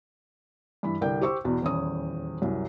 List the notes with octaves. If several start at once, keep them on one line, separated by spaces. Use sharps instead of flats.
G2 E3 B5
C2 D3 A#4 D5 G5 G6
G4 C5 C#6 E6
E2 B2
D#1 E2 E3 C#4 C#5 D#6
C2 F#2